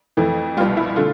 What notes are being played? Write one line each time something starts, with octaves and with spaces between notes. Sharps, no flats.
F2 E3 A3
C2 B2 G3 F4
E4
D3 A3 F4